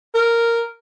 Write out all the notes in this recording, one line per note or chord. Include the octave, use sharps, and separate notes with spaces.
A#4